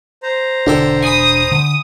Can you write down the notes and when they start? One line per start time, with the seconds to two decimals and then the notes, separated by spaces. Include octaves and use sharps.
0.23 C5 A#5
0.67 E1 D3 D4 A4 G5
1.03 G#5 B5 D#6
1.51 D3